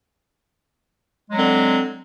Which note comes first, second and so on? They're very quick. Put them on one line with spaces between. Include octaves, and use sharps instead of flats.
G#3 F#3 C4 D3